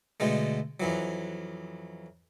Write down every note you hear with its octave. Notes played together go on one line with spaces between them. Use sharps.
B2 D3 G#3 A3
F2 E3 F#3